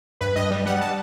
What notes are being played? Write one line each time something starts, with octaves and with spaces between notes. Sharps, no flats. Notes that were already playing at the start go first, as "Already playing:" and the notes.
G2 B4
G2 D#5
G3
G3 F#5
A5